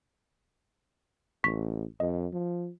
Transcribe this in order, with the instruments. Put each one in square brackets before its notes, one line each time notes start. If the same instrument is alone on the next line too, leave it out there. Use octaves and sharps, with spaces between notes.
[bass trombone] A1 [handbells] C#6 B6
[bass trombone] F2 [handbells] D#5
[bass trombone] F3